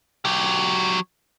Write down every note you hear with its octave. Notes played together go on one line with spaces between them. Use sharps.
F#3 G4